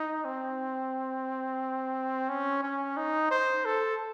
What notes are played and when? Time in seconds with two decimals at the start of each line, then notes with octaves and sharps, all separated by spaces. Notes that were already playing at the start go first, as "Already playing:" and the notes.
Already playing: D#4
0.25 C4
2.29 C#4
2.63 C#4
2.97 D#4
3.31 C5
3.65 A4